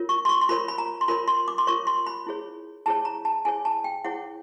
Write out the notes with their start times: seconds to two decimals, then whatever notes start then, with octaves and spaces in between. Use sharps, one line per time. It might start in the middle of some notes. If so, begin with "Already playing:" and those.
Already playing: F4 A#4 C#5
0.09 C#6
0.25 C6
0.29 C#6
0.41 C6
0.49 F4 A#4 C#5 B5
0.68 B5
0.78 A#5
1.01 C6
1.08 F4 A#4 C#5 B5
1.28 C6
1.48 D6
1.58 C6
1.67 F4 A#4 C#5 C#6
1.87 C6
2.06 B5
2.27 E4 G#4 C#5
2.86 E4 G#4 C#5 A5
3.05 A#5
3.25 A5
3.45 E4 G#4 C#5 G#5
3.65 A5
3.84 G5
4.04 E4 G#4 C#5 F#5